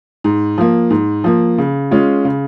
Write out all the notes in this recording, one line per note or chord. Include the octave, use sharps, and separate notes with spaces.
G#2
F3 A#3
G#2
F3 A#3
C#3
G#3 C#4 F4
C#3